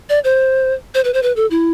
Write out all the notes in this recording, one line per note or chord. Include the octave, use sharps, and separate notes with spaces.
D5
C5
C5
B4
C5
B4
A4
E4